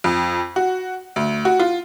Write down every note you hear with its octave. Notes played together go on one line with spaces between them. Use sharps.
F2
F#4
D2
F#4
F4